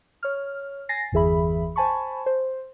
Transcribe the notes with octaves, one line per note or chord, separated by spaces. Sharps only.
C#5 F6
G#5 A6 A#6 C7
G1 E2 E3 G#4 E5 B5
C5 G#5 A5 B5 C#6
C5